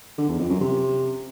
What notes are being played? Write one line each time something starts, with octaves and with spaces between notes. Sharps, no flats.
D3
E2
F2
F#2
C3